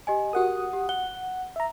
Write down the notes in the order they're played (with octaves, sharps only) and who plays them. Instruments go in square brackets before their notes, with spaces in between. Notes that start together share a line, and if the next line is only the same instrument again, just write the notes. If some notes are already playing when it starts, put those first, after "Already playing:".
[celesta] G4 D#5 G#5
[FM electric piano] F#4 F#5 D#6 [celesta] G4 A#4
[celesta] G4
[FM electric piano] F#5 [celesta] G7
[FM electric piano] E5 A#5